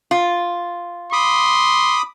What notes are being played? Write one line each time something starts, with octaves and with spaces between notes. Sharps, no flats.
F4
B5 C6 D6 D#6